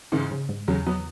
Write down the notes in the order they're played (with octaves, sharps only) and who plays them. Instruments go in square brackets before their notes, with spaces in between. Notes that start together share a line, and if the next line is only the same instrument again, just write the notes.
[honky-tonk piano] G#2 C#3 [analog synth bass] E3
[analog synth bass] C#3
G#2
[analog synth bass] E2 [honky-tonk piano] C#3 F#3
[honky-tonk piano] F#3 B3